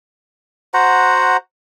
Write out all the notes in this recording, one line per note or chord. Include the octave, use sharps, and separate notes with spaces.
F#4 C5 F#5 A#5